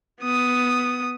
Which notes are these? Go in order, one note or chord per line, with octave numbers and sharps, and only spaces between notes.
B3 D#6